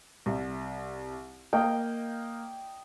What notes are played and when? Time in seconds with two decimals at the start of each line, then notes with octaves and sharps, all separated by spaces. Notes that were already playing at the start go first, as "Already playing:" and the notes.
0.26 C2
1.53 A#3 D#5 G5 A#5